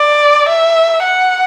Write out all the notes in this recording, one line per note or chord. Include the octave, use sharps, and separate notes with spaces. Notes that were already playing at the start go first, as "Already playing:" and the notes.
Already playing: D5
E5
F#5